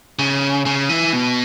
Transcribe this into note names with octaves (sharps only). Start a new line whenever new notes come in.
C#3
C#3
E3
B2